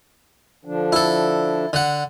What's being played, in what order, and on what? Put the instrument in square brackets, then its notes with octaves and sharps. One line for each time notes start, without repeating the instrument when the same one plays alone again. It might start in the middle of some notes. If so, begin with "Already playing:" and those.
[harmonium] D3 F3 D4
[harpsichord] E4 A4
D3 F#5